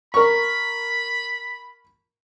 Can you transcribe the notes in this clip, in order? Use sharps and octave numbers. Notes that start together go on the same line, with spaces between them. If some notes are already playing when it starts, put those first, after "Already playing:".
A#4 B5 C#6